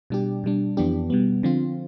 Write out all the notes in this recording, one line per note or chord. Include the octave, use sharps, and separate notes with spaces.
B2 G3 D4 G4
B2 G3 D4
F2 E3 B3 D4 G4
B2 G3 B3
D3 F3 C4 F4